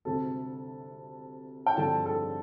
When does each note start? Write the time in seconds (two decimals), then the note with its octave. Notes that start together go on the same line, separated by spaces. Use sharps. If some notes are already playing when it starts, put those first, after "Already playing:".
0.05 D2 C3 G3 C4 A4 A5
1.66 G5
1.77 G2 D3 F3 C4 A4 A5
2.06 A4 A5